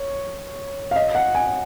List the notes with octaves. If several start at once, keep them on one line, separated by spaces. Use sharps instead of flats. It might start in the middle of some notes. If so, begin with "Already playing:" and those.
Already playing: C#5
F5
D#5
F#5
G#5